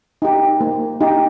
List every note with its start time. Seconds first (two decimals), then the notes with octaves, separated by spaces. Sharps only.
0.22 D#4 G4
0.61 A#3
1.01 D#4 G4